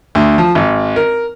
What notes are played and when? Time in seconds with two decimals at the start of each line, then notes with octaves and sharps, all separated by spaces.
0.15 D2
0.38 F3
0.55 G#1
0.96 A#4